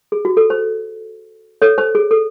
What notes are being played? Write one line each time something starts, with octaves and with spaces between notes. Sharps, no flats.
G#4
F#4
A4
C5
A4 C#5
C5
G#4
A4